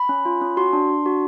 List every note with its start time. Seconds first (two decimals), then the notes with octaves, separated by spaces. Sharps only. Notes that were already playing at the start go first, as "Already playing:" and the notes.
Already playing: B5
0.09 C#4
0.25 F4
0.41 C#4
0.57 F#4 C6
0.73 D4
0.90 D4
1.06 F#4